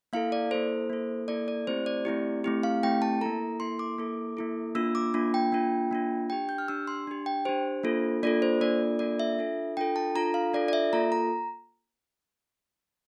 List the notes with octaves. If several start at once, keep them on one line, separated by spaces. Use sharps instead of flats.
A#3 E4 A4 F5
D5
A#3 E4 A4 C5
A#3 E4 A4
A#3 E4 A4 D5
D5
A3 C4 E4 G4 C5
D5
A3 C4 E4 G4
A3 C4 E4 G4
F5
A3 C4 E4 G4 G5
A5
A#3 E4 A4 A#5
A#3 E4 A4 C6
D6
A#3 E4 A4
A#3 E4 A4
A#3 D4 F4 E6
D6
A#3 D4 F4
G5
A#3 D4 F4
A#3 D4 F4
D4 G4 G5
G6
F6
D4 G4 E6
C6
D4 G4
G5
D4 G4 C5
A#3 D4 F4 A4
A#3 D4 F4 A4 D5
C5
A#3 D4 F4 A4 D5
A#3 D4 F4 A4 D5
E5
D4 F4 A4
D4 F4 A4 G5
A5
D4 F4 A4 A#5
F5
D4 F4 A4 D5
D5
E5
A#3 F4 A4 A#5
A#5